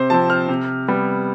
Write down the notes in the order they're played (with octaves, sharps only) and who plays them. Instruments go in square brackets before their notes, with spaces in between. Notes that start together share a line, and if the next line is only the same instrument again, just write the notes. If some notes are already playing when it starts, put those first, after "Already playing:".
Already playing: [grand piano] C3 C5
F3 C4 A5
F6
C3
G3 B3